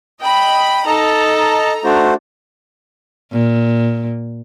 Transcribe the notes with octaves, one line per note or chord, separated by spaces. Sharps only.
D#5 G5 B5
D#4 A4 D#5 A5 A#5
A3 D4 F#4 C5
A#2